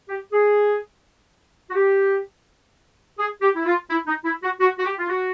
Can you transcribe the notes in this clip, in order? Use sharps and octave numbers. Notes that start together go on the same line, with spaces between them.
G4
G#4
F#4
G4
G#4
G4
E4
F4
E4
D#4
E4
F#4
F#4
F#4
G4
F4
F#4